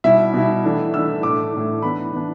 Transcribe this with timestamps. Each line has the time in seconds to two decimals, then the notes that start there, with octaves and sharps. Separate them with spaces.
0.04 B2 G3 E4 E5
0.34 B2 G3 E4
0.64 E3 A3 D4
0.94 E3 A3 D4 E6
1.23 A2 A3 D4 D6
1.53 A2 A3 D4
1.82 E3 B3 D4 B5
2.12 E3 B3 D4